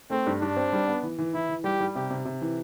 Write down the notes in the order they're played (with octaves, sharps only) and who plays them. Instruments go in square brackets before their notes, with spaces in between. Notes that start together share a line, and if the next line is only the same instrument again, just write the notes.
[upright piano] A3 [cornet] C4
[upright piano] G2
[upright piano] G2 [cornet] D4
[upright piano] C4
G3
B3
E3
E3
[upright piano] E3 [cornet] E4
[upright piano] E3
[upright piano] G3 [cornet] G4
[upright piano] G3
[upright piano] C3 [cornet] G4
[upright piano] C3
C3
E3